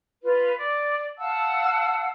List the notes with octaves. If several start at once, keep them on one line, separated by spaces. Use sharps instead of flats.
F4 B4
D5
F5 F#5 A5 E6